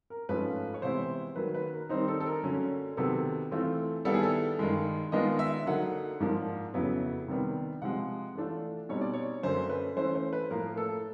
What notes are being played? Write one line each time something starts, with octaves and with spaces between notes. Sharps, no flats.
A#4
G#2 F3 A3 C#4 F4 B4
C#5
C3 E3 G#3 B3 E4 C5
D#3 F#3 A#3 B4
B4
A#4
D#3 G3 C4 D#4 C5
A4
A4
A#4
D3 F#3 A#3 C#4
C3 D#3 F#3 B3 A4
E3 A3 C4 F4
D#3 G3 B3 E4 A4
G#4
A4
G2 D#3 G#3
D#3 G#3 B3 D4 F4 D#5
E5
D3 F#3 A#3 D#4 F#5
G#2 F3 A#3 D4
F2 C#3 F#3 B3 E4
C3 D#3 G3 B3
C3 F3 G#3 F#5
E3 A3 D4 F4
B2 G3 C4 D#4 C#5
D5
C#5
F#2 D3 F#3 A#3 C#4 C5
B4
E3 A3 C#4 C5
C5
B4
A2 F3 A#3 A#4
A4